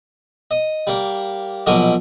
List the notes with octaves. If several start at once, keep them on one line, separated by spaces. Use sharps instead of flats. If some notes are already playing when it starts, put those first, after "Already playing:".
D#5
G3 A#3
A#1 B2 F#3 A#4 D#5 D6